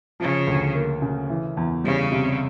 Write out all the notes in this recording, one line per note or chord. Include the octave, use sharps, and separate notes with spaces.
C#3 F3
D2
A#3
C#3
E3
E2
C#3 G3
C3